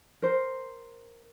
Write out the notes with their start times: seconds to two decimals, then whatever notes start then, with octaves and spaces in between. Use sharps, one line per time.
0.22 A#4 C5